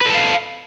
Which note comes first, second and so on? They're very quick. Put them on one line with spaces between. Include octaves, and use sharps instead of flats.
B4 A4 A5 F5